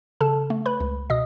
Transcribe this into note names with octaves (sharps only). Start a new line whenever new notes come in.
C#3 A4 A5
A3
B4 B5
C#2
B2 D#5 D#6